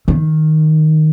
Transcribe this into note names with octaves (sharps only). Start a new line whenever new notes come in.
D#3